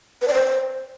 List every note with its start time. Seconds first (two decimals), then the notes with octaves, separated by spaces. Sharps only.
0.22 B4
0.28 D5
0.34 C5